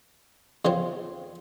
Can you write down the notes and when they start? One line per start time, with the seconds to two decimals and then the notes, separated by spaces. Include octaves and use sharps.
0.65 E2 C#3 F3 C4